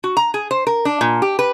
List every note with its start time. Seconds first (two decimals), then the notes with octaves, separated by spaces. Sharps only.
0.04 F#4
0.17 A#5
0.34 G#4
0.51 C5
0.67 A#4
0.85 D4
1.01 A#2
1.22 G4
1.39 B4